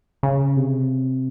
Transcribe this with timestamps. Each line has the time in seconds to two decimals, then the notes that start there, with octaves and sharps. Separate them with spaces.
0.23 C#3
0.57 C3